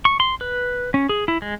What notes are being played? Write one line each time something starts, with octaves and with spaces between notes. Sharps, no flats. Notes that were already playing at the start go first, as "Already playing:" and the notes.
C#6
C6
B4
C#4
G#4
E4
G#3